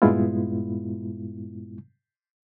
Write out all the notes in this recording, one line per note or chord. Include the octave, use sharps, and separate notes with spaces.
G2 A#2 G#3 B3 E4 F4